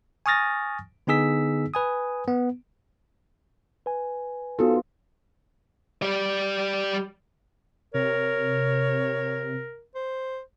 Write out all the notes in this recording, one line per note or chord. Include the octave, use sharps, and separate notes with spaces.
G#5 C#6 D#6 F6 A6 A#6
D3 B3 D#4 G#4 E6 B6
B4 G#5 D#6
B3
B4 G#5
B3 D#4 F4 F#4 A4
G3 D5
C3 A#4 C#5
C5